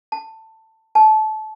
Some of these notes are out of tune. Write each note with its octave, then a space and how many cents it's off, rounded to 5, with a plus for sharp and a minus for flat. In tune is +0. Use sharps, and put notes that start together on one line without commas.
A5 +15
A5 -25